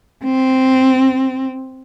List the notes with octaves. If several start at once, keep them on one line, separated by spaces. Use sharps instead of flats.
C4